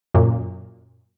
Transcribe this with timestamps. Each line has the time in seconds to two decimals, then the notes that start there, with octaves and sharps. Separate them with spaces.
0.14 F#2 A#2